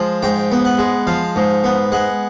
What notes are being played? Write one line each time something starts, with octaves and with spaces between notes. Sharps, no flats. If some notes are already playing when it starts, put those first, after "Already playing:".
Already playing: F3 G#3
G#2 G5
B3
F#5
G#3
F3 F5
G#2
B3
G#3 F#5